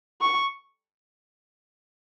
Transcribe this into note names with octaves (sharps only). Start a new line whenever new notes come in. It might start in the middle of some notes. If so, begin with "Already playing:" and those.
C#6